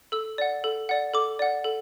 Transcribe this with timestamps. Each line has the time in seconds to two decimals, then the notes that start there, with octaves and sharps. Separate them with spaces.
0.12 A4 E6
0.38 D5 F#5
0.64 A4
0.89 D5 F#5
1.14 A4 D6
1.39 D5 F#5
1.64 A4